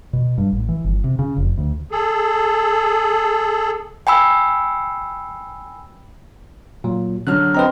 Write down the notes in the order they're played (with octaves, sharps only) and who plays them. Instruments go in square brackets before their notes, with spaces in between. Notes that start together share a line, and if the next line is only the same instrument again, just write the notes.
[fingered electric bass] B2
G2
A1
E3
G1
C3
C#3
F1
D2
[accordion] G#4 A4
[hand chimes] G5 G#5 B5 E6
[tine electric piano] A#2 F#3
[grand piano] D3 F#3 F6 [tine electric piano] F#6
[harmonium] C4 [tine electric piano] B4 D#5 A#5